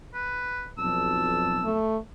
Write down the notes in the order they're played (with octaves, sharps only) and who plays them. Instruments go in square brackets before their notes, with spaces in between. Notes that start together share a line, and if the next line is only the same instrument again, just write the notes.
[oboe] B4
[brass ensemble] B1 F2 A5 [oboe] E6
[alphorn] A3